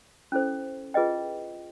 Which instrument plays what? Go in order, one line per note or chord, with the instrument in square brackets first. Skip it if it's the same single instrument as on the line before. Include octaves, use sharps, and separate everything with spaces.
[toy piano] C#4 E4 A4 C5
F4 G#4 B4 D#5 G5